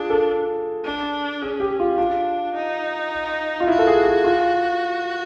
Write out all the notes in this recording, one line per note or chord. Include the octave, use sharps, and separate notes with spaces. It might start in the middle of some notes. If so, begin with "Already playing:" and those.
Already playing: D4 F4 G#4
A4
D4
C#4 G#4
G4
F4
D4 F4
D#4
F4
E4 F#4
A4
G#4
G#4
F4